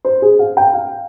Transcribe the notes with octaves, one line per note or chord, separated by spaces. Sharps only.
C5
G#4
F5
G5
F5